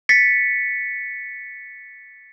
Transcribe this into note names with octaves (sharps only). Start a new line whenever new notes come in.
A6 B6 C#7